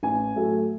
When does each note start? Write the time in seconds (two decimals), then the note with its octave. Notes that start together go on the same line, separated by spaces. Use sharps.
0.03 A1 G#5
0.36 A2 F#3 A3